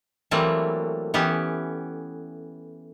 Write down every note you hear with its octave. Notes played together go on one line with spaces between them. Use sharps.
E3 F#3 G3 A3 A#3 C4
E3 B3 C#4 G4